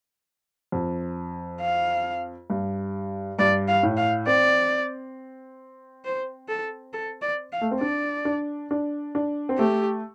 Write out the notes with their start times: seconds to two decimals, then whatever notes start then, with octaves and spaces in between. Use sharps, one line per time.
0.72 F2
1.61 F5
2.50 G2
3.39 G2 D5
3.68 F5
3.83 A2
3.97 F5
4.27 C4 D5
6.05 C5
6.49 A4
6.93 A4
7.22 D5
7.52 F5
7.61 A3
7.71 C4
7.81 D4 D5
8.25 D4
8.71 D4
9.15 D4
9.49 C4
9.58 A3 G4